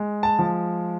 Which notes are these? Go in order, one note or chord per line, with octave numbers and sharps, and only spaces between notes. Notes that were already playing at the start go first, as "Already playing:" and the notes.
Already playing: G#3
A5
F3